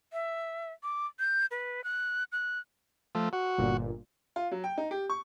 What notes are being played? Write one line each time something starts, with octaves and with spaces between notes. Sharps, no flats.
E5
D6
G6
B4
F#6
F#6
F3 A3
F#4
G1 A#2
F4
F#3
G5
D#4
G4
C#6